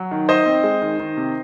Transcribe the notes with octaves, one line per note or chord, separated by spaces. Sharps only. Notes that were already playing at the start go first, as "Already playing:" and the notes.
Already playing: F#3
D#3
D#3 C5 D#5
C4
G#3
D#3
D#3
C3